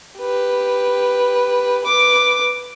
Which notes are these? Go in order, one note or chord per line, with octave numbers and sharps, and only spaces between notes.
G4 B4
B4 D6